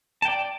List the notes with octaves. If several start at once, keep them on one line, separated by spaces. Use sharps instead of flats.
D5 G5 A5